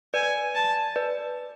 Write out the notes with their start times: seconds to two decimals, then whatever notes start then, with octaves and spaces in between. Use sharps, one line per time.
0.14 B4 D5 G#5
0.55 A5
0.96 B4 D5